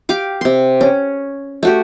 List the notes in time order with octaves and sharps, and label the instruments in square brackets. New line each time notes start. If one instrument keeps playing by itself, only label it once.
[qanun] G4 F5 D6
C3 C6
C#4
A3 F#4 G4